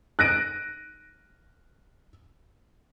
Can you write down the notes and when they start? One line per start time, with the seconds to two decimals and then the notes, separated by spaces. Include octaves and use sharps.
0.19 F#6 A#6 D7 D#7